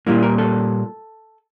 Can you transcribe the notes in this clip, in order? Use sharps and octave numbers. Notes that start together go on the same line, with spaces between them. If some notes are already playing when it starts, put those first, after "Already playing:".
A#2 G3 A#3 E4
A#4
A4